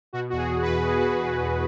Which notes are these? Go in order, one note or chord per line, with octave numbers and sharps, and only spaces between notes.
B2 F#4
E2 F#4
G#4
B2
B4
E2
B2 G#4
F#4
E2 G#4
B2
E2